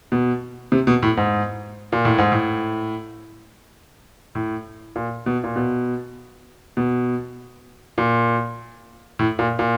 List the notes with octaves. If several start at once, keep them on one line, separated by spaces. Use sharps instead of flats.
B2
C3
B2
A2
G#2
A#2
A2
G#2
A2
A2
A#2
B2
A#2
B2
B2
A#2
A2
A#2
A#2